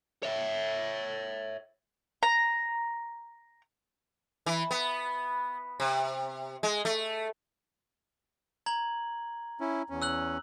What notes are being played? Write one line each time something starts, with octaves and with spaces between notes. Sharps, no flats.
C#5 E5
A#5
E3
B3
C3
G#3
A3
A#5 G#6 F#7
C#4 E4
E2 C#4
E6 F#6 F#7